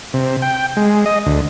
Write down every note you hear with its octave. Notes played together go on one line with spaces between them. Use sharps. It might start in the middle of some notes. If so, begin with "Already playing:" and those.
C3
G5
G#3
D#5
D2